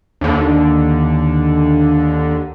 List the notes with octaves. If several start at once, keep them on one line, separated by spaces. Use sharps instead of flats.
D#2 D3